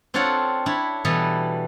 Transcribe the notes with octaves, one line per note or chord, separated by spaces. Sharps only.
C4 D4 F4 A4 C#5 F#5
D4 E4 C#5 B5
B2 E3 G3 B3 A4